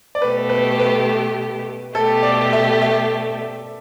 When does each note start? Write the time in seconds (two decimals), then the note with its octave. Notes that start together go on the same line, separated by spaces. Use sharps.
0.15 D5
0.21 B2 A3 G4 B4
0.49 B4
0.79 B4
1.94 B2 A3 G4 A4
2.23 D5
2.53 E5
2.82 E5